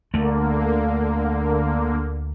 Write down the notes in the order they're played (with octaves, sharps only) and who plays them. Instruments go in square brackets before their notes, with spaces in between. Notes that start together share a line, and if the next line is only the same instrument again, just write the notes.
[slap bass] D2 A3 [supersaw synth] D3 A#3